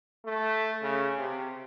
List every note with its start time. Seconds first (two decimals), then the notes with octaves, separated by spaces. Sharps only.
0.25 A3
0.83 C#3
1.19 C3